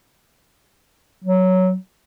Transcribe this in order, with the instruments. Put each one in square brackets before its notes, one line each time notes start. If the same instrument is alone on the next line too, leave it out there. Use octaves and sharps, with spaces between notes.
[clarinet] F#3